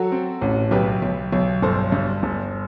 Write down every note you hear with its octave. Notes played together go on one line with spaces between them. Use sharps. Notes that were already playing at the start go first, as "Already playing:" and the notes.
Already playing: F#3 F#4 A4
C4
A1
B1 G4 B4
B1
B1
G1 A4 C5
G2
G1